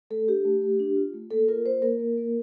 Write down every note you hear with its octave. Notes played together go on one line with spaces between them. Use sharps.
A3 A4
D4 G4
A3
A3
D4
F4
A3
A#3 A4
F4 A#4
A#3 C5
A#3 A#4
A#3
A#3